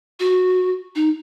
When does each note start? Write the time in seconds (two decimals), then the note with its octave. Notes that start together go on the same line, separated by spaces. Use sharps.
0.20 F#4
0.95 D#4